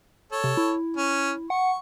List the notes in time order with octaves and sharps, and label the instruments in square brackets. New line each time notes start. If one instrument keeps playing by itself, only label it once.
[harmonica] A4 C#5
[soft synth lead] C3
E4
[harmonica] C#4 C#5
[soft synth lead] F#5 [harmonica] C#6